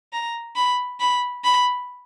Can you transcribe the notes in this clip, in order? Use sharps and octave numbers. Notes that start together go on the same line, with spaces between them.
A#5
B5
B5
B5